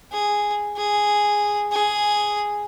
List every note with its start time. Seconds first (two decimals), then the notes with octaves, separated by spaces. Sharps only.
0.12 G#4
0.77 G#4
1.72 G#4